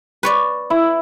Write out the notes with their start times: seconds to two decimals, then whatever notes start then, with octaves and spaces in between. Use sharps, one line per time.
0.23 B4 C#5 D5
0.70 E4